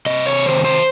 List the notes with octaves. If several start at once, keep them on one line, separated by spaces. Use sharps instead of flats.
C3 D#5
C#5
D#3 C5
C5